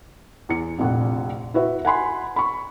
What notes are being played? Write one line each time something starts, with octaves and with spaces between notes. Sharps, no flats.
E2 C#7
F1 A#1 F#5
E4 F#4 B4 E5
F#5 G#5 B5 C6
B5 C#6